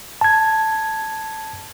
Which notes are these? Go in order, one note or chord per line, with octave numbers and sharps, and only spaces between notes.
A5 G#6